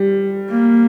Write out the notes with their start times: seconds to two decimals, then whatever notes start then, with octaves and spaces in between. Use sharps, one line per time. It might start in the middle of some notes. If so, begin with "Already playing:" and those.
Already playing: G3
0.50 A#3